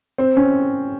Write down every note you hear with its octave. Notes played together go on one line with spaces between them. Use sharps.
C4
C#4